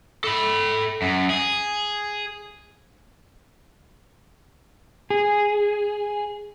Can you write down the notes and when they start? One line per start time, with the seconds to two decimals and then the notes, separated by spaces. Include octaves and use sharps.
0.24 A4 B5
1.02 F#2
1.30 G#4
5.10 G#4